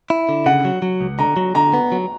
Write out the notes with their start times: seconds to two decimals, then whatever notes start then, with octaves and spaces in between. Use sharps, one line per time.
0.10 E4
0.29 D3
0.46 C#3 F#5
0.65 F#3
0.82 F#3
1.01 C#2
1.19 D3 A#5
1.36 F#3
1.55 D3 A#5
1.74 B3
1.92 F#3